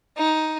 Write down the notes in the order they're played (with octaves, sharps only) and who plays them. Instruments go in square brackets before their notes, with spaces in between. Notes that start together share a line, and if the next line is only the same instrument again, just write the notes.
[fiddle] D#4